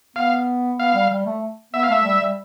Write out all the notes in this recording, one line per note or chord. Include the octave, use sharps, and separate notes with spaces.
B3 F5
B3 F5
G3
G3
A3
B3 E5
F5
A3 E5
G3
G3